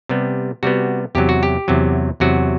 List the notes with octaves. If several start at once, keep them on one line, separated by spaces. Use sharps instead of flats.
C3 G3 B3
C3 G3 B3 F#4
E2 C3 F#3 G4
F#4
G4
E2 C3 F#3
E2 C3 F#3 F#4